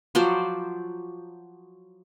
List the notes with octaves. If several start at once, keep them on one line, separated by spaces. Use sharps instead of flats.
F3 F#3 C5 D5